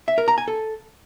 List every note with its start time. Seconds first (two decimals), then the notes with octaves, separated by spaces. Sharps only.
0.08 E5
0.18 A#4
0.28 A#5
0.38 G#5
0.48 A4